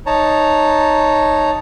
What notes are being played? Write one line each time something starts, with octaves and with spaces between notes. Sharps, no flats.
D#4 C#5 A5 A#5